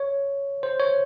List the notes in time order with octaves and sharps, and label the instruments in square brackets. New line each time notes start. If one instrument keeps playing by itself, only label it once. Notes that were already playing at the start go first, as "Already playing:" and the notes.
Already playing: [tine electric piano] C#5
C5
C#5